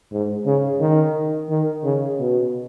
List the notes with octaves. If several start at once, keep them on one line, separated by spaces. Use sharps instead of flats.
G#2
C#3
D#3
D#3
C#3
B2